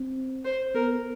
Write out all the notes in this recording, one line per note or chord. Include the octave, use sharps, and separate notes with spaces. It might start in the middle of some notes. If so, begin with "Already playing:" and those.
Already playing: C4
C5
B3 A#4